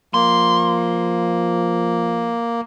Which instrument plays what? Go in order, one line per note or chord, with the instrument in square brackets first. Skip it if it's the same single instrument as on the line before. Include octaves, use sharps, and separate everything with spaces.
[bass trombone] F3 [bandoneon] A#3 [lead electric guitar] C6